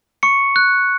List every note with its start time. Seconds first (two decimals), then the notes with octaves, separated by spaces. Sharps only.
0.23 C#6 C#7
0.56 F#6